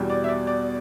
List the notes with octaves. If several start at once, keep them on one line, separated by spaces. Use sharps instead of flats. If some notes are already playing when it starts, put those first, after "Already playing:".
Already playing: E2 B2 G3
D5
E5
D5
D5